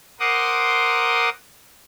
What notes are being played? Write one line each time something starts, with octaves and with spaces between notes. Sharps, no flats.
A#4 C5 F#5 C6 D6 D#6